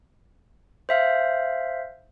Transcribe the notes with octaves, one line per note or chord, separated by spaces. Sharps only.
C5 E5 F5